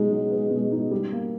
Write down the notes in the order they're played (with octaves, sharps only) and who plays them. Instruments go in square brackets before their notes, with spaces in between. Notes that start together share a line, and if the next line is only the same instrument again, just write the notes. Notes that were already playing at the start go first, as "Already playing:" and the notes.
Already playing: [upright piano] B2 D#4 [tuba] G#3
[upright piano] F#3
B3
B2
D#4
G3
A#3